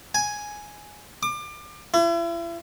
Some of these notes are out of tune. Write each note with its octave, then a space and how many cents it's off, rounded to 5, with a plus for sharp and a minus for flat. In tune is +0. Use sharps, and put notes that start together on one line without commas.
G#5 +5
D6 +30
E4 +40